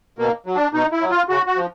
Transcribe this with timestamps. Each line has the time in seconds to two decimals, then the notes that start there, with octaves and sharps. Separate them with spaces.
0.19 B2 A#3
0.46 F#3
0.55 D4
0.74 B2 D#4
0.92 E4
1.01 F#3
1.10 F4
1.29 C#3 F#4
1.46 F#4
1.56 F3